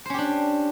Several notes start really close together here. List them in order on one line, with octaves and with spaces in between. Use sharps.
C5 C#4 G4 D4